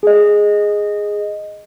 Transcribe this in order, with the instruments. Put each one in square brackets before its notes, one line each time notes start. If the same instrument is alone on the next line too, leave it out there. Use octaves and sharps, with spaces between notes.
[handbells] G#4 D#5